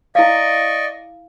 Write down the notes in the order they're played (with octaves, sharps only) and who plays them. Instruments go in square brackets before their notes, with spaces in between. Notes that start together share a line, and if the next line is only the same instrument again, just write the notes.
[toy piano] E4 F5 [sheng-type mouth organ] D5 D#5 C#6